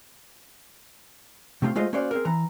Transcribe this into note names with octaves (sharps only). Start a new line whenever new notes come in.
C3 A3 C4 D#4 F4
G#3 A3 F4 C5 D#5
A#3 C#4 F#4 C5 D5 F5
C4 G#4 A#4
E3 A#5